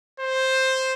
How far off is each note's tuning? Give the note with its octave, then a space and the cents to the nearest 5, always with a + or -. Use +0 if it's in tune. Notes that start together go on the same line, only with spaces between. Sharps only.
C5 +5